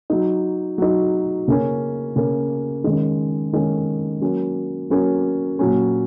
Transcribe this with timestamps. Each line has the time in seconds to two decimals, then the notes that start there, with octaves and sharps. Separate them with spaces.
0.10 F#3 D#4
0.78 F#3 D#4
1.48 C#3 A#3 C#4
2.16 C#3 A#3 C#4
2.84 D#3 G#3 C#4
3.53 D#3 G#3 C#4
4.21 F#3 A#3 C#4
4.90 F#3 A#3 C#4
5.59 A#2 F#3 C#4